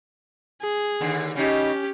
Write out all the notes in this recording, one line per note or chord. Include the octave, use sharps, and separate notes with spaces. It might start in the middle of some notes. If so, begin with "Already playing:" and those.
G#4
D#2 D3
C#3 C#4 D#4 G4